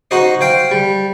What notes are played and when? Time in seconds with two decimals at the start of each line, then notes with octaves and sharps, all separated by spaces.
0.11 D#4 F#4 C5 D#5
0.41 C5 F5 G5
0.71 G3